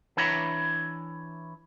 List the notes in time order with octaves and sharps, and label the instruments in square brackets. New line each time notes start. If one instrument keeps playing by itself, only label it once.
[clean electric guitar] E3 D4 E4 C#5 A#5 B5